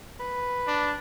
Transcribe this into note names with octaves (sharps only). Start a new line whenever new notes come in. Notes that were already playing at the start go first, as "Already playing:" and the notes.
B4
D4